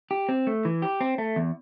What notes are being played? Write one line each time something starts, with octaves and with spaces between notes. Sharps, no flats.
G4
C4
A3
E3
G4
C4
A3
E2